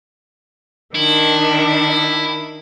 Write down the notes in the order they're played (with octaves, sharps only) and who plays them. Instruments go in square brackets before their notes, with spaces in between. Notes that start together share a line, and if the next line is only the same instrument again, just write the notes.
[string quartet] D#3 D4 [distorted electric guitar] E4